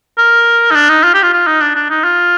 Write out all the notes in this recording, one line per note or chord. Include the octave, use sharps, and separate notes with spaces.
A#4
D#4
D4
D#4
F4
G4
F4
F4
D#4
D4
D4
D#4
F4